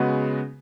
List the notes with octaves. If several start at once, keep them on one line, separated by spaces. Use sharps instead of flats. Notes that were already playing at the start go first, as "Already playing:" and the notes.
Already playing: C#3 G#3 B3 F#4 B4